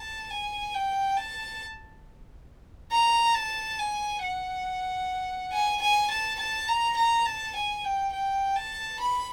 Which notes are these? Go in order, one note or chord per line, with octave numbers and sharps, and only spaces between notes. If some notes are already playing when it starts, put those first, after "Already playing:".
Already playing: A5
G#5
G5
A5
A#5
A5
G#5
F#5
G#5
G#5
A5
A5
A#5
A#5
A5
G#5
G5
G5
A5
B5